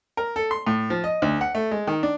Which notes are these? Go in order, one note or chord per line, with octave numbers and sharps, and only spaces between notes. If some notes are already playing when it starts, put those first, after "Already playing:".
A#4
A4
C6
A2
F3
D#5
D2
F#5
A3
G#3
D#3
D4